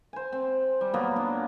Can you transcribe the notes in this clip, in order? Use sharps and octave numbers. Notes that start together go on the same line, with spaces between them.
C5 G#5
C4
G3
A#2 F#3 A#3 B3
D4